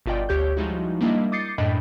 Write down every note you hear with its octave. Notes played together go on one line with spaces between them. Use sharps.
G1 B2 F4 D5 D#5 G5
D2 G4 C#5 G6
F3 G3 G#3 D#4 E4 F#4
G3 A#3 D4 E4 D#5
D6 D#6 G6 A6 C7 C#7
F#2 A2 D4 D#5 G5 B5